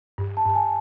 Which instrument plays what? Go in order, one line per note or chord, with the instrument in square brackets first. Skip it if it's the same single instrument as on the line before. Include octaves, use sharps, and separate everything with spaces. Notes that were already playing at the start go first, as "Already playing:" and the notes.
[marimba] G2
[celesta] A5
[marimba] G2
[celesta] G#5